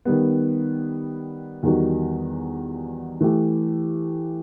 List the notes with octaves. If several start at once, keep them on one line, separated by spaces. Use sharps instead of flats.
D#3 G3 B3
E2 D#3 G3 D#4 F#4
E3 A3 E4 G4